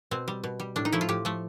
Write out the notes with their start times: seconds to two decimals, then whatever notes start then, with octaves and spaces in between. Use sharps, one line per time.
0.11 B2 C4
0.28 G3
0.44 B2
0.60 G3
0.76 A2 D4
0.85 D#4
0.92 F3 A3 E4
1.01 F4
1.09 A2 G4
1.25 F3 A3